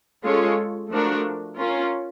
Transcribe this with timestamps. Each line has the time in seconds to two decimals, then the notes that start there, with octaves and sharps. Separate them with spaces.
0.23 G#3 C#4 F4 A4 C#5
0.91 F3 A3 D4 F#4 A#4
1.58 C#4 F4 A#4